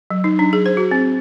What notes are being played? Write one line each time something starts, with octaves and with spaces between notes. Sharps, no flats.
F#3
D#4
D4
G#4
C5
F#4
C4